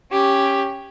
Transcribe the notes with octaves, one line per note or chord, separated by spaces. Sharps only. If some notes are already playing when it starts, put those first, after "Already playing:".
C#4 G4